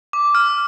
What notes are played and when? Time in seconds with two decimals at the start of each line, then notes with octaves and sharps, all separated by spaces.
0.13 D6
0.35 F6